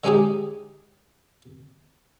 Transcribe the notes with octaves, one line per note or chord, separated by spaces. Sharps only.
D3 G#3 C#4 D#4 G4 G#4